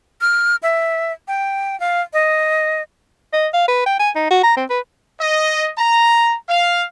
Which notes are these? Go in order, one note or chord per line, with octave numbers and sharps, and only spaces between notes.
F6
E5
G5
F5
D#5
D#5
F5
B4
G5
G#5
D#4
F#4
A#5
C4
B4
D#5
A#5
F5